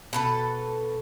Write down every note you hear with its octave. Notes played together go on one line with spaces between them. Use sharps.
B2 A4 B4